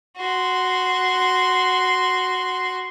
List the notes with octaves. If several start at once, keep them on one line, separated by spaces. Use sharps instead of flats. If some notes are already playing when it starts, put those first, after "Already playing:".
F#4 C6